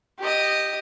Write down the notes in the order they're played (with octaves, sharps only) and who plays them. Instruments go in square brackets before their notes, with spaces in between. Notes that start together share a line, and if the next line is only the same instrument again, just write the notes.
[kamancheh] G4 D#5